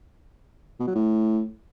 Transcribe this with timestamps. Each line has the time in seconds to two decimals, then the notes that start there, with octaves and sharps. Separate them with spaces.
0.80 B2
0.87 F#3
0.95 A2